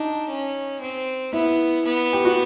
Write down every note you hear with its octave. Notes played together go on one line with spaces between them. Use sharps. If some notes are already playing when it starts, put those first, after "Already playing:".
Already playing: D4 D#4
C#4
C4
B3 E4
B3
G4
F#4